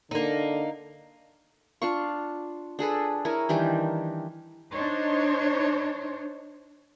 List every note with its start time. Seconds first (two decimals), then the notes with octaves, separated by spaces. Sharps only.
0.11 D3 A#3 D#4
1.82 D4 F4 F5 C#6
2.79 D4 G#4 A4 B4
3.25 E4 A#4 C#5 G#5
3.49 D#3 E3 G3 D4
4.72 D4 D#4 C5 C#5